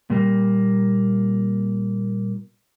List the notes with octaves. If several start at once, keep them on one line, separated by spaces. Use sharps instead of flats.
A#2 G3 A#3